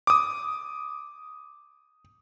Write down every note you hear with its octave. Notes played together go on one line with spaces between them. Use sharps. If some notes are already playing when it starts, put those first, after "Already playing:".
D6 D#6